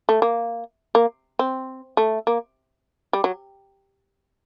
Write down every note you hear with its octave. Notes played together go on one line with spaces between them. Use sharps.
A3
A#3
A#3
C4
A3
A#3
G3
F#3